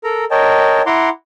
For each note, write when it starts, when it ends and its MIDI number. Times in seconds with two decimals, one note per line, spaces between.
0.04 0.25 69
0.04 0.25 70
0.04 0.25 82
0.31 0.82 70
0.31 0.82 73
0.31 0.82 75
0.31 0.82 79
0.31 0.82 81
0.86 1.09 64
0.86 1.09 78
0.86 1.09 82
0.86 1.09 84
0.86 1.09 86